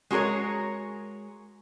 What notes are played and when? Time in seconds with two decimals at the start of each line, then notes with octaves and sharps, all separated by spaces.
0.11 G#3 F#4 G#4 A#4 C#5